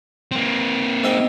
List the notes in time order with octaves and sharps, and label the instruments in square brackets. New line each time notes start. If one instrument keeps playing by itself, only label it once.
[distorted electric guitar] A#3 C4
[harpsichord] G#2 E5 G5